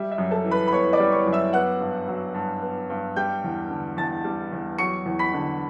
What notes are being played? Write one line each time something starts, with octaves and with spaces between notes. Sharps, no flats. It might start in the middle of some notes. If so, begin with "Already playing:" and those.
Already playing: G3 E5
E5
F#2
A4 A5
E3
B4 B5
B5
B3 C#5 C#6
D5 D6
G3
C#5 C#6
F#2
E5 E6
B3 F#5 F#6
G2
F#3
G2
B3
G2
G3 G5 G6
E2
D3
E2 A5 A6
G3
E2
F#3 C#6 C#7
E2
B5 B6
D3